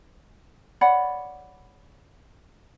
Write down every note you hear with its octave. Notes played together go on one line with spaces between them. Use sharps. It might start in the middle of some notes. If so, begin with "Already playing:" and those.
C#5 D5 F#5 B5